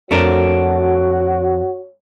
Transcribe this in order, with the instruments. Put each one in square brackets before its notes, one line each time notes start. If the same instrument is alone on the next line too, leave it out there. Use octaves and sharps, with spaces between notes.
[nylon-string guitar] F2 [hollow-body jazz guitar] A3 D4 A#4 [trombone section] F#4 [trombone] C#5